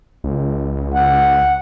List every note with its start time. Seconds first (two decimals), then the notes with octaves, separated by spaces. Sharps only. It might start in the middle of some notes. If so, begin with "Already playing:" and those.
0.24 C#2
0.94 F#5